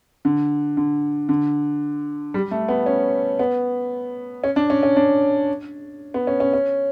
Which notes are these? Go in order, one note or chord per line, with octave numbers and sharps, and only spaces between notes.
D3
D3
D3
G3
A3
B3
C#4
B3
C#4
D4
C#4
C#4
D4
B3
C#4
C#4
C#4